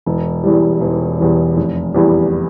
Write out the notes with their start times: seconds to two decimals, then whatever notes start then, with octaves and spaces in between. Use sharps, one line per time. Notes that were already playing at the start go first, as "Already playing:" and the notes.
0.06 E1
0.44 E2 E3 G3
0.81 E1
1.19 E2 E3 G3
1.57 F1
1.94 E2 E3 G3